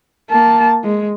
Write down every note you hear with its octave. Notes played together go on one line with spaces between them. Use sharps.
A#3 A5
G#3